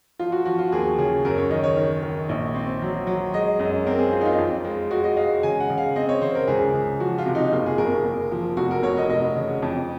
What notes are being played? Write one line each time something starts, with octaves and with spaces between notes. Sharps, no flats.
F3 F4
F#4
F3 F#4
F4
D#2 G#4
C#3 G#4
F#2 A#4
C#5
D#3 D#5
C#5
D#3
D#3
A#1
C4
F#3
F#3
G#3 D#5
F#2 D#5
C4 A#4
G#4
C4 F4
D#4
F4
F2
G#3
G#3 F#4
D#5
G#3 F5
C#3 G#5
F#5
C#3
F5
C4 D#5
C#5
C#3 C5
A#4
C#2 G#4
C#2
F3 F#4
F4
C3
D#4
F#1 F4
G#4
F#1 A#4
F#1
F3
F1 F#4
A#4
F1 C#5
D#5
F1 D#5
C#3
F2